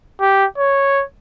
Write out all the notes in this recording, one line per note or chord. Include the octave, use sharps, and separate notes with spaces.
G4
C#5